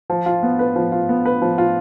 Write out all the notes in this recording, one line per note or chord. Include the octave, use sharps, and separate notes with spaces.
F3
F4
B3
B4
F3
F4
B3
B4
F3
F4